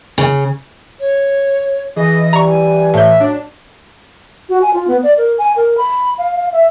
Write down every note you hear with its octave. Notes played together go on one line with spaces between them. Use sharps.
C#3
C#5
E3 G#4 D#5
G3 A#5 C#6
G#5
A2 E5 G6
F#3 D4
F#4
G#5
F4
B3
D5
A#4
G#5
A#4
B5
F5
F5
E5